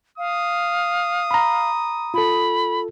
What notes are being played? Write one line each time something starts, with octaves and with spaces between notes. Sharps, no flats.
F5 D#6
A#5 B5
F4 A4 B5